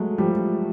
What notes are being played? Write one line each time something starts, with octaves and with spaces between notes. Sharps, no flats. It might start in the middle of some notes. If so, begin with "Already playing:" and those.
Already playing: F#3 G#3 A3
F3 G3